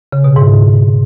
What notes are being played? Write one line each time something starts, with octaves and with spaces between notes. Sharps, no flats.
C#3
B2
G#2